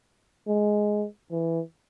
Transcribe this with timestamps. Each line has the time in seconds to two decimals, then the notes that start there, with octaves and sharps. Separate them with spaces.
0.47 G#3
1.31 E3